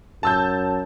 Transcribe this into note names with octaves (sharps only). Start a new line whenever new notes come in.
F#2 A5 E6 G6